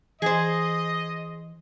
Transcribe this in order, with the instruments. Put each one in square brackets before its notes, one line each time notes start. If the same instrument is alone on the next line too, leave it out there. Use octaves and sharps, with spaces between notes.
[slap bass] E3 [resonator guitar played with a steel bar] G#4 C5 [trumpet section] D#5